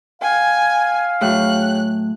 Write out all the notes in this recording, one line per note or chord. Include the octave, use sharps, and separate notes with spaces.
F5 G5 G#5
A2 F#3 G#4 C#5 G5 F#6